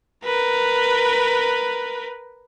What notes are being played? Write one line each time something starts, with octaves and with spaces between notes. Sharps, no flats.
A#4 B4